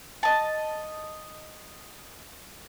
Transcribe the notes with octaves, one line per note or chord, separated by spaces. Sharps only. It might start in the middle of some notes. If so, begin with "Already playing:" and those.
D#5 A5